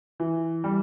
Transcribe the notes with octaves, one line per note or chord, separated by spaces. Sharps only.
E3
G3